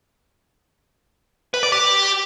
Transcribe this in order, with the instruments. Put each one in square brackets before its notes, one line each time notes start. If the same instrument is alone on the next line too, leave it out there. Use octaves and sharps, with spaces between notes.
[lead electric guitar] B4
D5
G4